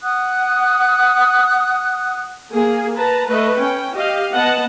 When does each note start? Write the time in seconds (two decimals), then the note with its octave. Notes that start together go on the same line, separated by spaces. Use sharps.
0.02 F#5 D#6 F#6
2.52 A#3 G#4
2.96 B4 A5 A#5
3.29 A3 B4 D#5
3.59 C#4 G5
3.94 G4 D#5 F5
4.32 B3 D#5 F#5 A5